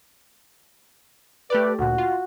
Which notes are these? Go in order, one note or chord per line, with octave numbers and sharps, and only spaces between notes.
A3 G4 B4 D5
D2 A#2 F#4
F4